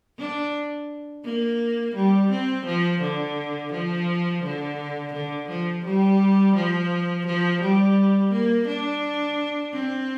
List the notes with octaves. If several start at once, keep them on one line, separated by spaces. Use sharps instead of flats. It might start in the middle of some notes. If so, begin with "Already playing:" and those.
D4
A#3
G3
C4
F3
D3
F3
D3
D3
F3
G3
F3
F3
G3
A#3
D4
C4